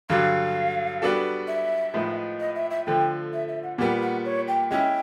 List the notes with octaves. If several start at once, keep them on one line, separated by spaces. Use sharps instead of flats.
G2 D3 F#3 F5
G3 B3 D4 F#4 A4
E5
A2 F3 G#3 B3 D#4
D#5
E5
E5
D3 F3 A3 G5
E5
E5
F#5
A#2 G3 B3 F#5
F#5
C#5
G5
G#3 C#4 E4 G5